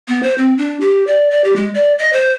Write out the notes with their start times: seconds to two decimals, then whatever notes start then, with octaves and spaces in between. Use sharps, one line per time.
0.08 B3
0.23 C5
0.38 C4
0.58 D4
0.80 G4
1.07 D5
1.31 D5
1.44 G4
1.56 G#3
1.74 D5
1.99 D#5
2.13 C5